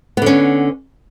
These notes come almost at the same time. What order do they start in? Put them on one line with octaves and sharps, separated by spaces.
B3 D3 C#4